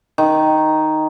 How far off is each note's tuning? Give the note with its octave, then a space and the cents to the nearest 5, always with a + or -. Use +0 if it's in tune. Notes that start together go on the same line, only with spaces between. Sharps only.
D#3 +0